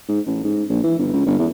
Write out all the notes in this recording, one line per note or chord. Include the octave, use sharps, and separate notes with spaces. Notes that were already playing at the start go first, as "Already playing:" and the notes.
G#2
A1
G#2
A#1
E3
G1
C#2
G1
E2